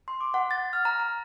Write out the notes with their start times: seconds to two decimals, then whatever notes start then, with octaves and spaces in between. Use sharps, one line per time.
0.08 C6
0.21 D6
0.34 F#5
0.51 A6
0.73 F6
0.85 A#5
1.00 A#5